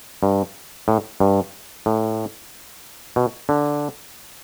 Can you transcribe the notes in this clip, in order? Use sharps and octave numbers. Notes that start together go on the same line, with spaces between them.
G2
A2
G2
A2
B2
D3